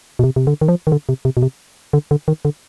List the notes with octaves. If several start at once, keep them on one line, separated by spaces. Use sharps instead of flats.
B2
C3
C3
D3
D#3
F3
D#3
D3
C3
C3
B2
C3
D3
D3
D#3
D3